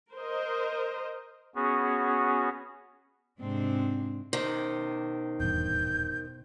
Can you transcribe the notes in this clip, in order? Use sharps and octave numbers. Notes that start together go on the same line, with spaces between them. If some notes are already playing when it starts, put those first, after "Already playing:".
A#4 C5 D#5
B3 C#4 F#4 G#4
G#2 C3 G#3 C4 D4
B2 D#3 C5
D#1 E2 G2 G6